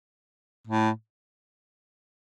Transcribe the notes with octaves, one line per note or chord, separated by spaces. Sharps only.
A2